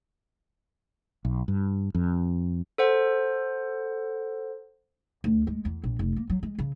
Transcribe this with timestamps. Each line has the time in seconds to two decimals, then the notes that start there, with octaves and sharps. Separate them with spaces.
1.25 B1
1.48 G2
1.95 F2
2.78 A4 C5 F#5
5.24 D2
5.47 G#3
5.65 E2
5.84 A#1
5.99 F1
6.16 A#3
6.30 F#3
6.43 G#3
6.59 C#3